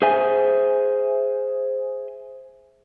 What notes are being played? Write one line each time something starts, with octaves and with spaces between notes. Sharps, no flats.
G#4 C5 E5 G#5